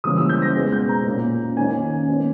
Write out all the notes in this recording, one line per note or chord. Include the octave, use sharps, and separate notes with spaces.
C#3 E3 G3 A#3 C#4 D#6
E6
G6
A#6
B2 G#3 B3
G6
A#5
A#2 A#3 C#4
D#3 A#3 C#4 G#5
B2 A#3 C#4